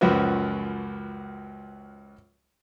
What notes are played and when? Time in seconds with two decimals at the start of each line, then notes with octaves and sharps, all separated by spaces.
0.01 C#2 F#2 F3 F#4 B4